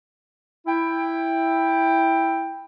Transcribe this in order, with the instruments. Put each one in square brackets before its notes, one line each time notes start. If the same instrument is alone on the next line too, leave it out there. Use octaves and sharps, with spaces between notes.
[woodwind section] E4 G5